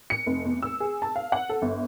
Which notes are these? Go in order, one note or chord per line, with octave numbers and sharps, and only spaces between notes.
C#7
F1
E2
E6
G#4
A5
F5
F#5
A4
G1